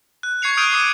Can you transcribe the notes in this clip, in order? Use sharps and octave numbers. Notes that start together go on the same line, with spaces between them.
F#6
C#6 G#6 C7 C#7 F7
D#6 F6 G6 D7 D#7 F7
D6 D#6 C7 D#7